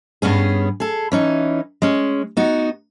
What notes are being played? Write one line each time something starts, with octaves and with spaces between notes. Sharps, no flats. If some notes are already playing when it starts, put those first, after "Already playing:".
G2 B3 C#4 G#4
G#4 A4
E3 C#4 D#4
G#3 C#4
B3 D#4 F#4